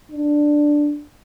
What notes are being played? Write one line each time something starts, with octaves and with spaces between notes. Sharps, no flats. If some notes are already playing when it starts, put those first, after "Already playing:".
D4